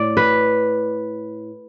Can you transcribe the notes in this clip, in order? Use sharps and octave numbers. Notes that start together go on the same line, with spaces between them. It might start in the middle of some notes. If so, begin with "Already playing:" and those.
Already playing: A2 D5
B4